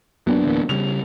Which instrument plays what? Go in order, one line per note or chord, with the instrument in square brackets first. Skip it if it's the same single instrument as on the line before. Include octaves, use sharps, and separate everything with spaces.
[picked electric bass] F#2 F#3 A#3 [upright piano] B3 D4
[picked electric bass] D1 E3 A#3
[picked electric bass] C#3 G3 [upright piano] F7